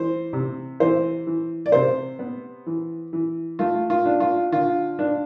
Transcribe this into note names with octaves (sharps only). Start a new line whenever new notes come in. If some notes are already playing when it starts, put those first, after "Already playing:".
Already playing: E3 C5
C3
E3 C5
E3
D5
C3 C5
B3
E3
E3
A3 F4
F4
D4
F4
D3 F4
D4